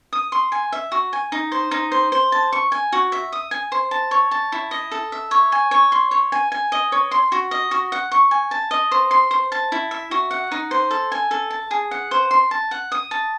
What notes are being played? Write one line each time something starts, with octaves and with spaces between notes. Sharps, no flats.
D#6
C6
G#5
E5
F#4
G#5
D#4
C5
D#4
C5
C5
A5
C#6
G#5
F#4
E5
D#6
G#5
C5
A5
C#5
A5
E4
D#5
A4
E5
C#5
G#5
C#5
C6
C#5
G#5
G#5
D#5
C#5
C6
F#4
D#5
F#4
F#5
C#6
G#5
A5
D#5
C5
C6
C5
A5
E4
E5
F#4
F#5
D#4
C5
A4
G#5
A4
A5
G#4
F#5
C5
C6
A5
F#5
D#6
A5